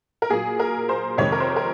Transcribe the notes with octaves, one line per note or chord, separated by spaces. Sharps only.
A#4
A#2 F#3 A#3 G#4
A#4
C5
F2 C3 D#3 G#3 C#5
A#4
C5
A#4